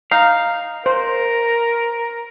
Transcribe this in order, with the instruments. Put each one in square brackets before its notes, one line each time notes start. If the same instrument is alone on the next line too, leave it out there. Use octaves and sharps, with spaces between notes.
[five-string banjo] D#4 [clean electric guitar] F5
[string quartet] A#4 [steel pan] C5